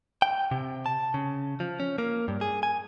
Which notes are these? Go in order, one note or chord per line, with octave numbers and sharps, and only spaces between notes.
G5
C3
A5
C#3
F3
C#4
A#3
G2
G#4
G#5